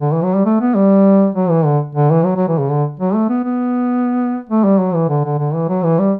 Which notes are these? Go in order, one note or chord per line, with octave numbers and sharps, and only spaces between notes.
D3
E3
F#3
G3
A3
B3
G3
F#3
E3
D3
D3
E3
F#3
F#3
E3
C#3
D3
F#3
A3
B3
B3
A3
G3
F#3
E3
D3
D3
D3
E3
F#3
E3
G3